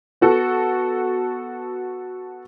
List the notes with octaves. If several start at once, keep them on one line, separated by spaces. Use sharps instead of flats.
B3 F#4 A4